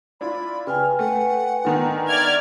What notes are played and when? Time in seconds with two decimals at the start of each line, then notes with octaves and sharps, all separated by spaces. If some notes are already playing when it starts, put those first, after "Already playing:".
0.21 D4 E4 F4 B5
0.67 C#3 B4 G5 G#5 F6
0.99 A3 F#5
1.65 D3 D#3 B3
2.07 D5 E5 F6 G#6